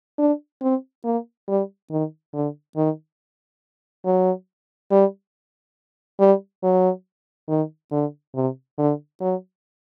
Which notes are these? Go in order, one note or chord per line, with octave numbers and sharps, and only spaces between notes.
D4
C4
A#3
G3
D#3
D3
D#3
F#3
G3
G3
F#3
D#3
D3
C3
D3
F#3